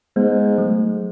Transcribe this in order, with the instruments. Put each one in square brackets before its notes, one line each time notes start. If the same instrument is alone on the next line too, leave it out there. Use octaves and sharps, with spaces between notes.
[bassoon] G#2 [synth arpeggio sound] G#3 B3
[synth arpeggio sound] F#3 A3